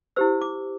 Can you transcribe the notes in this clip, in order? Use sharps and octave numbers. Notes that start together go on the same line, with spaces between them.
E4 G4 C5 E6
D6